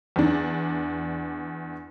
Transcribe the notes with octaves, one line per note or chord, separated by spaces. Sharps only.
E2 D4